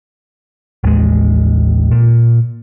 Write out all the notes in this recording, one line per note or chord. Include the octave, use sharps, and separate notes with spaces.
A1 D#2 G#3
A#2